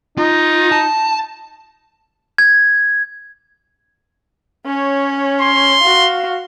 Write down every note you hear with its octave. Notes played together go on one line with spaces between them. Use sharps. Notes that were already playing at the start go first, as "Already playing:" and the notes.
D#4 F4
A5
G#6
C#4 C#5
C6
F#4 F5